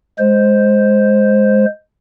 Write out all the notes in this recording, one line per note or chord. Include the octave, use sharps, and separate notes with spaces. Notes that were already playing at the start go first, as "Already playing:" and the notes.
G#3 C5